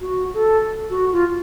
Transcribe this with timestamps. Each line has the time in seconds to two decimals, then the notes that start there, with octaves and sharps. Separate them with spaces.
0.01 F#4
0.34 A4
0.90 F#4
1.12 F4